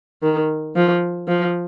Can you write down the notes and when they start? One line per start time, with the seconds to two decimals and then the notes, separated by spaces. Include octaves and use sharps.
0.22 D#3
0.75 F3
1.28 F3